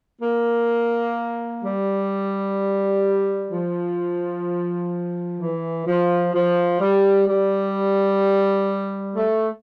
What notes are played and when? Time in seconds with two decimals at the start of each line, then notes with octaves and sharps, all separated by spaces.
0.22 A#3
1.63 G3
3.51 F3
5.39 E3
5.86 F3
6.33 F3
6.80 G3
7.27 G3
9.16 A3